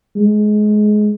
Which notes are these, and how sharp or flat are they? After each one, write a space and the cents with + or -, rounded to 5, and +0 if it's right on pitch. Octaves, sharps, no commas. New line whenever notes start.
G#3 +20